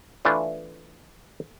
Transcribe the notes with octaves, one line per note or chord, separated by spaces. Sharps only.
E3 A3 D4 E4 F4